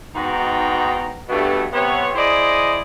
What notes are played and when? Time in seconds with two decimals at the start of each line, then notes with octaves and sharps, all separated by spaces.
0.15 G#2 B2 D#4 F#4 G5 A#5
1.28 G2 B2 A3
1.73 C3 B3 C#5
2.15 E4 G#4 C5 D5 D#5